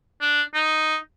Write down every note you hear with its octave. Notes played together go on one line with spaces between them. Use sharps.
D4
D#4